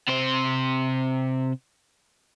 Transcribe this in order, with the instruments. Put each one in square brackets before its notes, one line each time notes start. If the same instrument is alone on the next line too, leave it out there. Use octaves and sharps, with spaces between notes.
[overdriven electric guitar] C3 C5